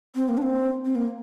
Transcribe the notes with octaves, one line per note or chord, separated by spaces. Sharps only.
C4
A#3
D4
C4
C4
A#3